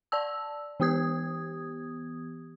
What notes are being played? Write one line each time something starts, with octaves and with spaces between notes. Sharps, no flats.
D5 A5 E6
E3 B3 G4 D#6 G#6